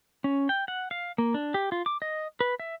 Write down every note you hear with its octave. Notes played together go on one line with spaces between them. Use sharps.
C#4
G5
F#5
F5
A#3
D4
G4
F4
D6
D#5
B4
E5